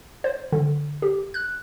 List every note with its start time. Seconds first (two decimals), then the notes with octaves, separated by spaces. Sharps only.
0.24 C5
0.52 D3
1.02 G4
1.34 F#6